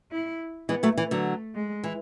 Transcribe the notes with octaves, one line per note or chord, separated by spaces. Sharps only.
E4
E3 G#3 B3
F#3 A3
E3 A3
D3 F#3
G#3
E3